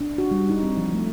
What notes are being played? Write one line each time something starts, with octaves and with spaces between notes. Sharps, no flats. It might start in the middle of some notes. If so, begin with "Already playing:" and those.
D4
F#4
G3
D#4
C4
F3
A3